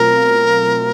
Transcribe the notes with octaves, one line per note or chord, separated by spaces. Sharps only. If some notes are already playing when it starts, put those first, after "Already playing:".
Already playing: B2 F#3 A3 C4 F4 A#4